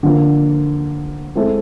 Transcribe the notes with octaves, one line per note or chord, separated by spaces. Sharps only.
D3 F3 A#3
G#3 C4 E4 A4